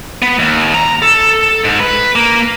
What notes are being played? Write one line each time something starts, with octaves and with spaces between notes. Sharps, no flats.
B3
D#2
A#5
A4
G#2
B4
A#3